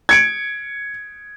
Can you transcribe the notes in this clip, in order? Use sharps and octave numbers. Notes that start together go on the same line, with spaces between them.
G#6 C#7 D7